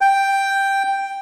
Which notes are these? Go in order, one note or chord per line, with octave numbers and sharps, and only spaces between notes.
G5